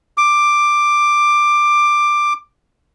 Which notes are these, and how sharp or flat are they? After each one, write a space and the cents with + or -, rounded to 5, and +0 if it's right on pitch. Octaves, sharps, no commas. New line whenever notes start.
D6 +10